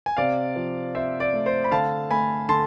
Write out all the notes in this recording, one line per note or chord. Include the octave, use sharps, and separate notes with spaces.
G#5
C3 D5 F5
F3
C4 C5 E5
D5
A3
C5
B5
D3 F5 A5
A3 G#5 B5
D3 A5 C6